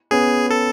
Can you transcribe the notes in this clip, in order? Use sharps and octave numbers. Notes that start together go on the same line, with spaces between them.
B3 C#4 G#4
A4